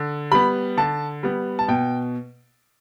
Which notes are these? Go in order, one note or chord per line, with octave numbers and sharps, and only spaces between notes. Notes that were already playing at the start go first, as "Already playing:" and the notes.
Already playing: D3
G3 B3 B5
D3 A5
G3 B3
A5
B2 G5